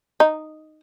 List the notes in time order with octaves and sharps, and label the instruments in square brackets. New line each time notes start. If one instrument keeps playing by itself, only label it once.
[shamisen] D#4